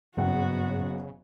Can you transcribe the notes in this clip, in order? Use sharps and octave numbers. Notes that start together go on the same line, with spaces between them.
F#1 G2 C#3 B3 F#4 F#5